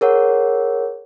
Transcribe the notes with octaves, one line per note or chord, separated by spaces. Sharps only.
G#4 A#4 C#5 F#5